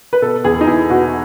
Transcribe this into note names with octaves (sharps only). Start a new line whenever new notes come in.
B4
B2 A4
E2 G#4
D#4
E2 E4
B2 F#4